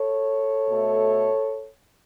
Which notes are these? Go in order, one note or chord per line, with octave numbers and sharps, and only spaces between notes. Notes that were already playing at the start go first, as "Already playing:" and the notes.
Already playing: A4 C#5
B2 A3